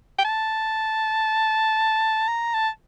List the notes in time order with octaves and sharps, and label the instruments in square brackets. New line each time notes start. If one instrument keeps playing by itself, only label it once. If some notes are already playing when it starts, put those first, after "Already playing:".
[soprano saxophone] G5
A5
A#5
A5